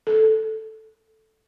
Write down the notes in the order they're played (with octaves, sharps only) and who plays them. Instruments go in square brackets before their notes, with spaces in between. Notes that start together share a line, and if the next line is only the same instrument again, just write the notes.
[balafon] A4